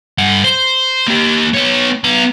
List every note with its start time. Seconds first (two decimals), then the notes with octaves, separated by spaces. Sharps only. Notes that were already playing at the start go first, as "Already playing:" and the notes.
0.18 G2 F#5
0.44 C5
1.08 A#3 G4
1.55 B3 C#5
2.04 B3 A#5